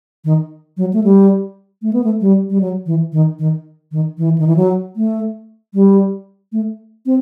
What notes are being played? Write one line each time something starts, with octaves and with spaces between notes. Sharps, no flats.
D#3
F#3
A3
G3
A3
B3
A3
G3
G3
F#3
E3
D#3
D#3
D#3
E3
D#3
E3
F#3
A3
G3
A3
C4